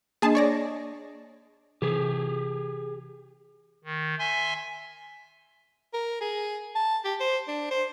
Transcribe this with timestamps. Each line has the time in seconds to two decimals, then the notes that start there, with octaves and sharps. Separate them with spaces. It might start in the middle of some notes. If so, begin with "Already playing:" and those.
0.22 A#3 D4 G#4 D#5 A5
0.35 C#5 D5 A#6
1.82 C3 E3 G4 G#4
3.84 D#3
4.19 E5 G#5 C6
5.94 A#4
6.21 G#4
6.75 A5
7.05 G4
7.20 C5
7.48 D4
7.71 C5